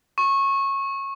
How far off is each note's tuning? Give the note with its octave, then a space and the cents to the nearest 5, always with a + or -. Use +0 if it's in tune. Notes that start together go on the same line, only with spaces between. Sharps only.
C#6 -20